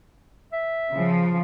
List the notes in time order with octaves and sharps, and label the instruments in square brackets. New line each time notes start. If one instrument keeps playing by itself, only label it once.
[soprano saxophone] E5
[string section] C#3 F3